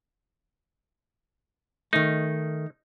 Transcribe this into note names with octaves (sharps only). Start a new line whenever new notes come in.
D#3 A3 D#4